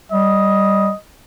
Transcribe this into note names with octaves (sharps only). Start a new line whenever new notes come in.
G3 D#5